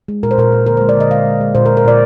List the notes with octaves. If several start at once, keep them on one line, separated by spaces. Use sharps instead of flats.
G#3
A#2 A#4
C5
A#2 A#4
A#2
D3 A#4
G#3 C5
D5
D3 D#5
G#3 F5
G#3
G#3
A#2 C5
A#4
G#3
A#4
A#2 D5